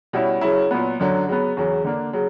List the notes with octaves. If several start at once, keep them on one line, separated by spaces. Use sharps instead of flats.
B2 G3 C#4 E4
C#3 F#3 C#4 E4
A#2 F#3 B3
F#2 D3 F#3
C#3 F#3 B3
E2 C#3 F#3
D3 A#3 D4
C#3 F#3